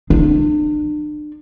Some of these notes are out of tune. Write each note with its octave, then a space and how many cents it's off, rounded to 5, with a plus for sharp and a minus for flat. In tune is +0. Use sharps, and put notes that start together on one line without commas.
D4 +40